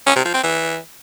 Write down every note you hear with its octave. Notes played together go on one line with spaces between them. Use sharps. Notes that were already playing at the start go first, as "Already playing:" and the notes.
C#4
C3
F3
C4
E3